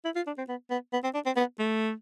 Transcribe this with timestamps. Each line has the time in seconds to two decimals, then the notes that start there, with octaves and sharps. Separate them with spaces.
0.05 E4
0.16 F4
0.27 D4
0.38 C4
0.49 B3
0.71 B3
0.93 B3
1.04 C4
1.14 D4
1.26 C4
1.37 B3
1.59 A3